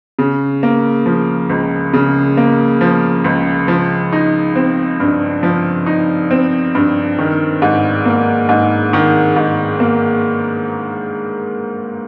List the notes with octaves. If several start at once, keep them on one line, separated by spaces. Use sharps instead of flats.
C#3
A#3
F3
C#2
C#3
A#3
F3
C#2
F3
D#4
C4
G2
F3
D#4
C4
G2
D#3
G#2
A#3
G#2
D#3
G#2
A#3